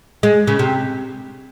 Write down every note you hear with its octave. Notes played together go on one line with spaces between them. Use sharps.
G#3
C#3
C3